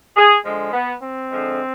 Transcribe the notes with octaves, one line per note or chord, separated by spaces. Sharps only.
G#4
D3 F3 G#3
B3
C4
D3 F3 G#3